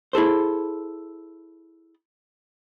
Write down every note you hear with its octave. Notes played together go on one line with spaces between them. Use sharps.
E4 G#4 A4 C5